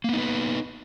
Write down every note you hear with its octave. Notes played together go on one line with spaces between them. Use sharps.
A#3 B3 D#4 B4